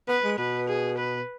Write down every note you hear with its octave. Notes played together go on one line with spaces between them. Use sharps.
B3 B4
G#3
B2 B4
G#4
B4